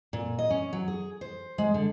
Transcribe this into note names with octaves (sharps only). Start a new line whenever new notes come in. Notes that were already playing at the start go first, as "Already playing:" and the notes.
A#2
D#5
C#4
F#3
G#4
C5
G#3
D3